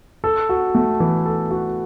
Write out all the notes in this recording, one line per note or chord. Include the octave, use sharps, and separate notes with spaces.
A4
F#4
A3
E3
A4
F#4